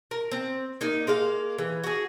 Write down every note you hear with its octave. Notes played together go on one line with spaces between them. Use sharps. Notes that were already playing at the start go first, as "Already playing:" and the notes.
A#4
C4
A#3 D#4
G#3 A#3 F5
E3
F#4 G#4